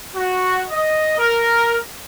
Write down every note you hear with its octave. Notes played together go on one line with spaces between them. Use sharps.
F#4
D#5
A#4